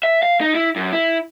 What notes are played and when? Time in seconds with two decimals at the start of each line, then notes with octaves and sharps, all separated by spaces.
0.03 E5
0.23 F5
0.41 D#4
0.55 E4
0.76 F#2
0.92 E4